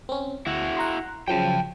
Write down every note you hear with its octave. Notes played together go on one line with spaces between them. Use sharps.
C4 C#4
D2 E4 F#4
F#5 A#5 C6
C#3 F3 F#3 G5 A5